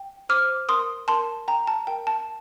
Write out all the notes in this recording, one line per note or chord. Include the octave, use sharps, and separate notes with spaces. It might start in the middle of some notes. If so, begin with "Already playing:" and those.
Already playing: G5
C5 D6 F6
A#4 C6 D#6
A#4 A5 C6
G5 A#5
A5
A#4 G5
A5